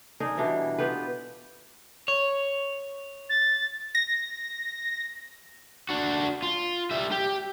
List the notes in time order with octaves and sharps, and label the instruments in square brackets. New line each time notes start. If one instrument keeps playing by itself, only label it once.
[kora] D4 D#4 G#4 A#4
B2 E3 G3 D4
B3 F4 G4 B4
[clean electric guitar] C#5
[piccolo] A6
[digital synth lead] A#6
[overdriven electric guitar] D4 F#4
F4
G3 E5
G4